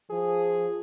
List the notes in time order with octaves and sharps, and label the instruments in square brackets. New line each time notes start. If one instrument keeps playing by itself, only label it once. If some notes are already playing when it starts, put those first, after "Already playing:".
[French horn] F3 [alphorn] G#4